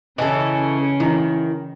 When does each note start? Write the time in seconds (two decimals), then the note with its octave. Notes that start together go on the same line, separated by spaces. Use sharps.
0.18 C#3 E3 C#4 A4 D#5 G#5 A5
1.00 D#3 E3 A#5